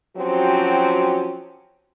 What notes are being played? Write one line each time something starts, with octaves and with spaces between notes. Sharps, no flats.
F3 F#3 C4 C#4 F#4 G4